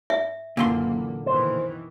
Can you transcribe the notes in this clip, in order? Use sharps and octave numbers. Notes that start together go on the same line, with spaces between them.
E5
F#1 A#2 D3 E3 A#3 C6
B2 D#3 E3 C5